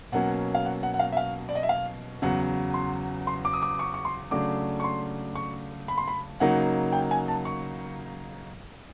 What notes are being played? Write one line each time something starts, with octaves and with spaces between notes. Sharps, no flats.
B2 F#3 A#3 C#4 F#5
F5
F#5
F#5
F#5
F5
E5
F5
D5
D#5
E5
F5
E2 C#3 F#3 F#5
C6
C6
D6
D#6
D6
C#6
C#6
C6
C#3 F#3 A3 D4 D6
C#6
C6
C#6
B5
C6
B5
C#3 F#3 A#3 D#4 F#5
G5
G#5
A5
C#6